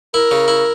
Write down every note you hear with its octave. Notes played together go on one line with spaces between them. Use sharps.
E4 A#4
C#3
E4